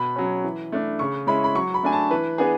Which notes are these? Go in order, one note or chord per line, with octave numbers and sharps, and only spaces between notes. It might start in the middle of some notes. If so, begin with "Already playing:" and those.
Already playing: B2 B5
F#3 C#4
E3
A3 D4
C#3 C#6
G#3 C#4 E4 B5
B5
F#3 C#6
B5
A3 D4 G#5
A5
E3 B4
B3 D4 G#4